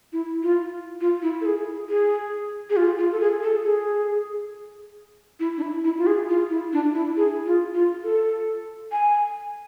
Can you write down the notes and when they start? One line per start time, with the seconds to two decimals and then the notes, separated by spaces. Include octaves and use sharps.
0.13 E4
0.43 F4
1.01 F4
1.22 E4
1.41 A4
1.46 G#4
1.90 G#4
2.70 G#4
2.77 F4
2.98 F4
3.13 A4
3.21 G#4
3.43 A4
3.64 G#4
5.40 E4
5.58 D4
5.62 E4
5.84 E4
5.98 F4
6.07 G#4
6.29 F4
6.50 E4
6.73 D4
6.95 E4
7.17 G#4
7.46 F4
7.74 F4
8.04 A4
8.92 G#5